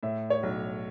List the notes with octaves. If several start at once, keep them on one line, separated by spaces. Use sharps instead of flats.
A2 E5
C#5
B1